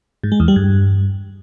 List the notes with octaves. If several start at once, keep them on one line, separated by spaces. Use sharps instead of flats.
G#2
G#3
E2
G3
G2